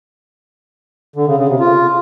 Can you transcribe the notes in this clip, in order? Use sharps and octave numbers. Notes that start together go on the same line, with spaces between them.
D3
C#3
C#3
C3
F4